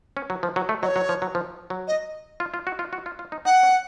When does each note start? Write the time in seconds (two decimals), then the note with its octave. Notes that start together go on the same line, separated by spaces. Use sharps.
0.17 C#4
0.30 F#3
0.43 F3
0.56 F#3
0.69 A3
0.82 F#3 D#5
0.86 C#5
0.96 F#3
1.09 F3
1.22 F#3
1.35 F3
1.70 F#3
1.88 D#5
2.40 F4
2.54 F4
2.67 F#4
2.79 F4
2.93 F#4
3.06 F4
3.19 F4
3.32 D#4
3.45 D#4 F#5
3.63 C#4